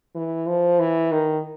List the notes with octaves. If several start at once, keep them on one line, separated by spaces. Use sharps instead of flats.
E3
F3
E3
D#3